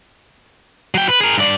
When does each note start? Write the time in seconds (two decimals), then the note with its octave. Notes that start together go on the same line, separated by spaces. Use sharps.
0.95 F#3 G5
1.09 B4
1.20 G#4 A#4
1.38 G2 D5